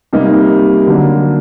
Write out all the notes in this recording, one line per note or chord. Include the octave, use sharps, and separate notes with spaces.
C3 G3 A#3 D#4
D3 F#3 A#3